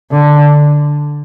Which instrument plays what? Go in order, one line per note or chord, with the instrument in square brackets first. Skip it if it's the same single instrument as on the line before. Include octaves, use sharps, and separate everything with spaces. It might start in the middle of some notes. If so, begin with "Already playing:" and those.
[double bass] D3